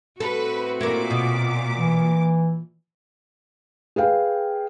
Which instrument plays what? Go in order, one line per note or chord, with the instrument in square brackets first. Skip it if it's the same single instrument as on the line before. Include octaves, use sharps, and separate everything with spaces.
[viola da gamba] A2 C4 F#4 [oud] A4 [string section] B4
[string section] A#2 D6 [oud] E4 A#4
[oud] B2
[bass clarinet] E3
[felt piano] G#4 B4 F5 G5